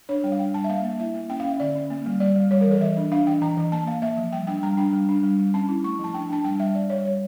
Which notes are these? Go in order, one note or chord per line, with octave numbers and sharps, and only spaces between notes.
D4 C#5
G3 G5
F5
D4 G5
G3 A5
E5
A#3 F5
A#3
E4 E5
A#3
C#4 G5
F5
C#4
E5
D3 D5
C#4
A#3
G3
G3 D5
G3
G3 C#5
A#4
E3 A4
E3 E5
D4
D4 F5
E3 G5
E3 A#5
E3
A#3 A5
A#3 F5
A#3 E5
F3
G3 G5
D4 G5
G3 A#5
D4 G5
G3
D4
G3
G3
C#4 A5
E4
A3 C#6
F3 A5
D4 G5
D4 A5
G3 G5
G3 E5
G3 D5
G3 C#5
G3 C#5